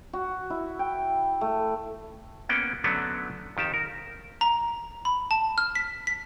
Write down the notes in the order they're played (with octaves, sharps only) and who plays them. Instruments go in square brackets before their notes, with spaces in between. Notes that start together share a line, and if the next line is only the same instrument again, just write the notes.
[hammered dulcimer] F#4
E4
G5
A3
[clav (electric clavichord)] A#3 B3 C#4 F#5 G5
D3 F#3 A3 B3 C#4 D4
F2 D#3 G4 A5
A#4
[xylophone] A#5
B5
A5
F6
B6
B6